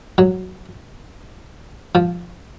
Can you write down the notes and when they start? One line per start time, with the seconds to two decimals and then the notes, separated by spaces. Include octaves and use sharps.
0.18 F#3
1.95 F3